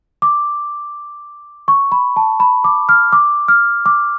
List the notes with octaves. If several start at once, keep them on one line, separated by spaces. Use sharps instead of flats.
D6
C#6
B5
A5
B5
D6
F6
D6
F6
D6